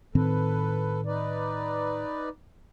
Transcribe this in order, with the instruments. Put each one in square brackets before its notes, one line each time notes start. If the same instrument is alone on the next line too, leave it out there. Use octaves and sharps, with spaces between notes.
[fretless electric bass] A2 D#3 C4 [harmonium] A4 B4
[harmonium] D#4 B4 D5